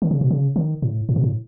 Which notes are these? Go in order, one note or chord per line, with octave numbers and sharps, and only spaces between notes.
D#3
C#3
B2
C#3
D#3
A2
A2
B2
A2